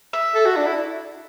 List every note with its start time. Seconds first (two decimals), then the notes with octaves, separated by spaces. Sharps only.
0.13 E5
0.35 A4
0.46 F#4
0.56 D4
0.67 E4